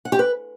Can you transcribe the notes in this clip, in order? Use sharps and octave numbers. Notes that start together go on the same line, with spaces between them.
F#5
G4
B4